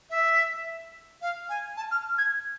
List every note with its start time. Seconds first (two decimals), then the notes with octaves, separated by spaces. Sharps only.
0.10 E5
1.22 F5
1.49 G#5
1.77 A5
1.91 F6
2.18 G#6